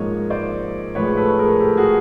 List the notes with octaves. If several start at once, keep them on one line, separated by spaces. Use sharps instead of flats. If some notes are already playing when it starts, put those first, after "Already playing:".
Already playing: G#2 F3 A#3 C#5 D#5
C5 D5
A2 F3 G#3 B4 C#5
A4 B4
G#4 A#4
G4 A4
F#4 G#4